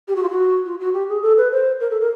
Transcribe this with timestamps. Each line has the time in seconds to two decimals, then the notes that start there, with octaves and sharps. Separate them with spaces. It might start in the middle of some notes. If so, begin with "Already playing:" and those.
0.08 G4
0.16 F#4
0.23 F4
0.30 F#4
0.65 F4
0.80 F#4
0.94 G4
1.09 G#4
1.22 A4
1.38 B4
1.52 C5
1.80 A#4
1.90 A4
2.01 A#4